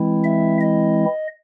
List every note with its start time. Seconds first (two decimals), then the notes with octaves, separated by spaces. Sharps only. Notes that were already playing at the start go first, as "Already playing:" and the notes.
Already playing: E3 G#3 C4 E4
0.24 E5
0.61 D#5